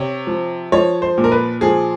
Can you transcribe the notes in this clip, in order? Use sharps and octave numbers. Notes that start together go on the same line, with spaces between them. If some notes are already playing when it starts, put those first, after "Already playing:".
Already playing: C3 C#5
F3
F3 C#5
C5
A#2
A#4
B4
F3 G#4